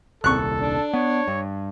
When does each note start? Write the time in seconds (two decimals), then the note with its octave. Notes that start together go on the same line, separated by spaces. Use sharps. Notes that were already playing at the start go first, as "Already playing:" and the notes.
0.24 D#1 C2 A4 C#6 F#6
0.60 D4
0.94 B3 C#5
1.28 G2